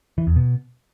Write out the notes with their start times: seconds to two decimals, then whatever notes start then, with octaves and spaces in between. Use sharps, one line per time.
0.18 E3
0.27 E2
0.36 B2